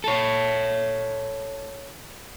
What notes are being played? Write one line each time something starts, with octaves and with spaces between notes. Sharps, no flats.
A4 C#5